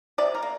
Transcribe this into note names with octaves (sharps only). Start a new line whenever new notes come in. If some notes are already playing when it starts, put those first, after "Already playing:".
C3 D5
A#4
A#3